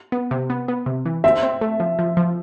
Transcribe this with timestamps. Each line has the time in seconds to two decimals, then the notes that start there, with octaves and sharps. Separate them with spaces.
0.12 B3
0.31 C3
0.50 B3
0.68 B3
0.86 C3
1.06 E3
1.24 C4 E5
1.43 C4
1.61 A3
1.80 F3
1.99 F3
2.17 F3